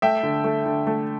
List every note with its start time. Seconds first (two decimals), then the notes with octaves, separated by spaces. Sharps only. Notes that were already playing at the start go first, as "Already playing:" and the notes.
0.02 A3 E5 G5
0.23 D3
0.44 A3
0.66 D3
0.87 A3